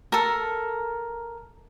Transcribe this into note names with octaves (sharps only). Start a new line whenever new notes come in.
A4 A#4